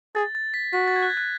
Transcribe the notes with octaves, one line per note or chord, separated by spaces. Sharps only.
G#4 A6
A6
B6
F#4 B6
A6
G#6
F#6
G#6
F#6